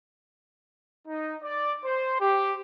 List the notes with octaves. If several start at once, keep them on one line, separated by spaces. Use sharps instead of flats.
D#4
D5
C5
G4